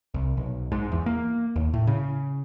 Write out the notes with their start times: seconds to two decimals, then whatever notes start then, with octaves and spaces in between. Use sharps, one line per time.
0.14 C2
0.37 B1
0.72 G#2
0.92 E2
1.06 A#3
1.56 D#2
1.74 A2
1.87 C#3